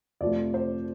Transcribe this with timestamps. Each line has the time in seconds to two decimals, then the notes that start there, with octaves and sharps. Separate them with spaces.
0.21 F2 C3 F3 A3 D5
0.54 C5